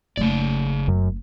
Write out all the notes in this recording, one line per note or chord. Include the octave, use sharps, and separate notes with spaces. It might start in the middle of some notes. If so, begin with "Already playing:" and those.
F#1 C#3 A3 D5
F#2